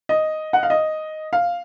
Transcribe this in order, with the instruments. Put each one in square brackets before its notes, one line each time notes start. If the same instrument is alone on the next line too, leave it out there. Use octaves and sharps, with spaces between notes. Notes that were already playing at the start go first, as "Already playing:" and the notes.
[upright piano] D#5
F#5
F5
D#5
F5